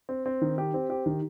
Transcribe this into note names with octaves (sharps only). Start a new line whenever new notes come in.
C4
C4
D#3
G4
C4
G4
D#3